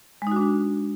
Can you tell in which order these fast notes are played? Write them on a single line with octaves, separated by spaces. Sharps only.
G#3 D#4 F#4 D4